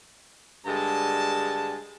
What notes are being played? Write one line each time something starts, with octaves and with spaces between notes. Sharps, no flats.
G2 D3 G#3 A5